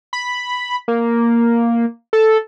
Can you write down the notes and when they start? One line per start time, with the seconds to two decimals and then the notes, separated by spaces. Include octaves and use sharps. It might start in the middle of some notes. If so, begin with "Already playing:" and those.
0.13 B5
0.88 A#3
2.13 A4